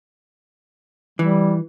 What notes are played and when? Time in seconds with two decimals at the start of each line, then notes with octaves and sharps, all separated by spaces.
1.19 E3 G3